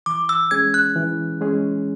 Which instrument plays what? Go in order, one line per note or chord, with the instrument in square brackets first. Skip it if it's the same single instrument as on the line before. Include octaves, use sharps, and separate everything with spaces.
[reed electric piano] E3 [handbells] D6
[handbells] E6
[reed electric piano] G#3 C#4 G#4 [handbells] G#6
[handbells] F#6
[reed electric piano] E3
G#3 C#4 G#4